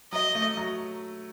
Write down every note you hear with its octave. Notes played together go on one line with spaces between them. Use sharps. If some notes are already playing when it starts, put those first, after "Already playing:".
F#3 D#5
A3
F#3